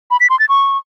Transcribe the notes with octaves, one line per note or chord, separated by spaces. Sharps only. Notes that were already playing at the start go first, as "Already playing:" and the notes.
B5
B6
C6
A6
C#6